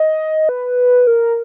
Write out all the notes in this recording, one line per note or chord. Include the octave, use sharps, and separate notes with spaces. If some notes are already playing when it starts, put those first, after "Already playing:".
Already playing: D#5
B4
A#4